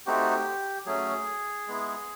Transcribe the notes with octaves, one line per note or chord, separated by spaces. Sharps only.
A3 C4 D#4 F#4 G4
F#3 A3 C#4 G#4
G#3 B3 E4